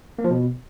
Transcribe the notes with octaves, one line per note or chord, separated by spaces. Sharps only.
A#3
F3
B2